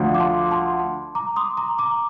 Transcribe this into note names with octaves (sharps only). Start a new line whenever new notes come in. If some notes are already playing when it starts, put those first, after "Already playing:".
Already playing: D2 D3 F3
D6
A5 C6
A5 C6
A#5 D6
C6 D#6
A#5 D6
A#5 D6